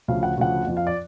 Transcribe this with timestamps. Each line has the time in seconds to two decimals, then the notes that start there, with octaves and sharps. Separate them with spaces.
0.08 D2 C#3 F3 F5
0.23 F#5
0.38 D2 C#3 F3 F#5
0.67 F2 F3
0.77 F5
0.87 D5